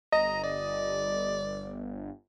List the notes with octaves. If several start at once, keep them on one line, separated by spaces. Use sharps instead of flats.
G1 D#5 A#5
D5